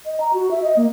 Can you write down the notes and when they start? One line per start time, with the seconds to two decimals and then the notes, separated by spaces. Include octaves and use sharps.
0.06 D#5
0.20 A#5
0.33 F#4
0.51 E5
0.63 D#5
0.77 A#3